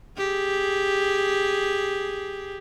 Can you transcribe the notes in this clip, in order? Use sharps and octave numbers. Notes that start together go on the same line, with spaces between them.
G4 G#4